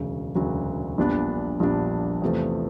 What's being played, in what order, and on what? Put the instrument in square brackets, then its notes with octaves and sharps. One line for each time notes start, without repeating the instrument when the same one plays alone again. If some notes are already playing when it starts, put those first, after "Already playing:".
Already playing: [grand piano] E1 D2 C#3 F#3
E1 D2 C#3 F#3
A#1 A#2 G3 B3 D4
A#1 A#2 G3 B3 D4
E2 C3 F3 A3